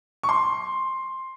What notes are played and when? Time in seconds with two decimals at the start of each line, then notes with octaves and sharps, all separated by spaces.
0.23 C#6
0.29 C6